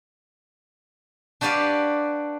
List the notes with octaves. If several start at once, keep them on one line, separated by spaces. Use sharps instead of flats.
D4 F#4 G4 B4 D5 F5